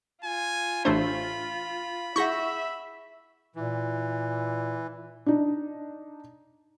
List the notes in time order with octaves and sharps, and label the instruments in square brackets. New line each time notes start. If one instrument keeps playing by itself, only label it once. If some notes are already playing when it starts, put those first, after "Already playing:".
[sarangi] F4 [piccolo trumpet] G#5
[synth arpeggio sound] A1 A3 C5 [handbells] D4 [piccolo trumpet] B5
[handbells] E4 G#4 F#5 [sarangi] E5 [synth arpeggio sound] C#6 G6 A#6
[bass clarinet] A#2 [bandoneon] E3
[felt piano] D4 D#4